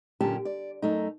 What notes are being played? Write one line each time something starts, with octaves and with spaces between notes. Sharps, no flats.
F#2 A#2 D3 C#4 G4 A5
D5
F#2 A3 D#4